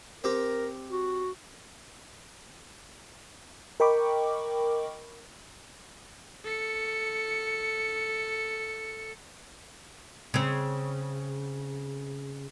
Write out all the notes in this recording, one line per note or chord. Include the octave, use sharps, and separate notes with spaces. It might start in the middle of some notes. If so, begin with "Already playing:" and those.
C4 G4 A#4
F#4
A#4 D#5 G5 B5 C#6 D6
A4 C#7
C#3 C4